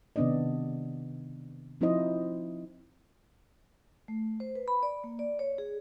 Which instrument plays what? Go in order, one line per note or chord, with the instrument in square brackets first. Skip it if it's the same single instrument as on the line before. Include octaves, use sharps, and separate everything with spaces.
[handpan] C3 D#3 B3 D4 D5 D#5
F3 C4 D#4 E4 C5 D#5
[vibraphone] A3
C5
B4
B5
D5
A#3
D5
C#5
G#4